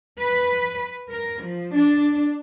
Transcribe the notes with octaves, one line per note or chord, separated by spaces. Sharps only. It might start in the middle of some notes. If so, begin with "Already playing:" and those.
B4
A#4
F3
D4